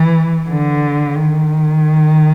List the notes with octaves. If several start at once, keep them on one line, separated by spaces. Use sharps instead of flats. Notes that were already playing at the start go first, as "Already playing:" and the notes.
Already playing: E3
D3
D#3